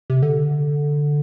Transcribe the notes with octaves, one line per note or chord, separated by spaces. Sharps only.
C3
D3